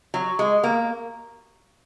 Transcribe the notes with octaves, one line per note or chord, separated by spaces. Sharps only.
F#3
G#3
A#3